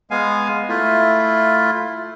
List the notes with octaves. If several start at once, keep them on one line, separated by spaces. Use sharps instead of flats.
G#3 B3 F5 G#5
A3 E4 F4